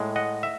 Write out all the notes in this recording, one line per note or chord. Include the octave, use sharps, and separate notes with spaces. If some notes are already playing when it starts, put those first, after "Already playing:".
Already playing: A2 G#3
D#5 F#5
E5